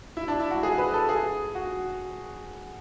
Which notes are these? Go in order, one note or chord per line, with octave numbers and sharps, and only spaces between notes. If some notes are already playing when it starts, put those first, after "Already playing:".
E4
D4
E4
F#4
G#4
B4
A4
G#4
F#4